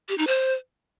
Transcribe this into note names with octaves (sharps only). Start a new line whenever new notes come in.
G4
D#4
C5